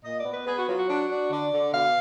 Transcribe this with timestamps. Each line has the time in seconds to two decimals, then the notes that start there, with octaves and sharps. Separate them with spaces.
0.04 A#2 D#5
0.18 D5
0.25 B3
0.32 B4
0.46 B3 G#4
0.57 F#4
0.67 F#3 F4
0.78 F#4
0.89 D4
1.10 D4
1.30 D3 D5
1.52 D3
1.73 B2 F5